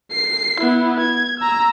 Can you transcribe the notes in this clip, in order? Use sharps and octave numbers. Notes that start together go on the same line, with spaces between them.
C7
B3 E4
G#6
A#5 E6